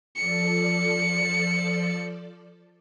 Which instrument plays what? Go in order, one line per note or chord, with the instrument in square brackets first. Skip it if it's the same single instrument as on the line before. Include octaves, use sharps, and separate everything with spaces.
[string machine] F3 A4 D5 [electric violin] C#7